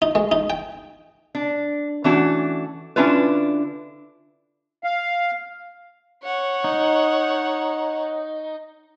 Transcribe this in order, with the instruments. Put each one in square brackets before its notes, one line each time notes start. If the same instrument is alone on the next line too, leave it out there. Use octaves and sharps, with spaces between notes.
[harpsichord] D#4
G#3
D#4
G5
[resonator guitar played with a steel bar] D4
E3 A3 C#4 D4 F#4
D3 C#4 D4 E4 F4 B4
[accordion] F5
[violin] C#5 F#5
[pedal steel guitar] D#4